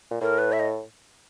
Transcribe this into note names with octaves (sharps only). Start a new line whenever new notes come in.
A#2
A2 A#4
B4
E5
D#5